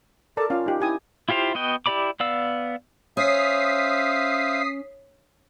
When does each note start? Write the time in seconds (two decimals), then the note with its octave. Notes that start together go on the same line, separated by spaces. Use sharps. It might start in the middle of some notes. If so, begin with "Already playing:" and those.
0.37 A4 A#4 D5 A5
0.50 C#4 F4 F5
0.66 D#4 G4
0.80 E4 G4 G#5 D#6
1.29 E4 F4 G4 C5 F5
1.55 B3 F#4 D#5 G5
1.86 E4 G4 D5 B5 D6
2.20 B3 D5 F5 E6
3.17 C#4 C5 E5 F5 D#6 B6 C7